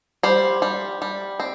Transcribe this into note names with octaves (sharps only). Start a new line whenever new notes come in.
G3 C5
G3
G3
C4